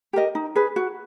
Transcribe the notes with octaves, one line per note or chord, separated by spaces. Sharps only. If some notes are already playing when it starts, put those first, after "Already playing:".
G4 A#4 D#5
D#4
G#4 B4
F#4